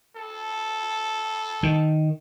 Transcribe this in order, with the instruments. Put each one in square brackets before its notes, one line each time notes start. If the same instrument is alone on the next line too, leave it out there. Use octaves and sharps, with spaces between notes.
[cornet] A4
[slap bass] D#3